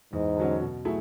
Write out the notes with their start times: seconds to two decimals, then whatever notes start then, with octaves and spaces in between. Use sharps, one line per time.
0.13 E2 G#2
0.37 D3 F#3 C#4
0.61 B2
0.85 F#3 A3 E4 G#4